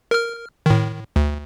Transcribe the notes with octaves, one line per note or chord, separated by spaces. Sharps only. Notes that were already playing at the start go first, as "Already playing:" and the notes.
A#4 F6
A2 D#3
D2